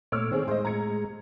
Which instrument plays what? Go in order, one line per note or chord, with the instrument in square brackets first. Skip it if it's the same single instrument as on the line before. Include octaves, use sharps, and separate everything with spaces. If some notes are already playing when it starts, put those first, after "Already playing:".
[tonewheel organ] A#2 A3 D6 [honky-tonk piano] C#5 E6 F6
[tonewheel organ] D#3 C#5 [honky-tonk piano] C4 G#4
[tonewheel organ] A2 G#3 [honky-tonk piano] C5 D#5
[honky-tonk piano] A#5 G#6 C#7